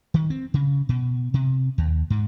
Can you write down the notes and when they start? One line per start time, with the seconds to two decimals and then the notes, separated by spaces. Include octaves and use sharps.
0.14 D#3
0.30 C4
0.54 C#3
0.89 B2
1.34 C3
1.78 D#2
2.10 G#2